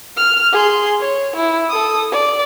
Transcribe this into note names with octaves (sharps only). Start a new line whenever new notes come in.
F6
G#4 C6
C#5
E4
A4 D#6
D5